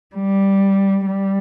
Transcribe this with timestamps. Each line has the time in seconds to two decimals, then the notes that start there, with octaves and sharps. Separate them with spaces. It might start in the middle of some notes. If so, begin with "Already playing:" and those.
0.16 G3
1.06 G3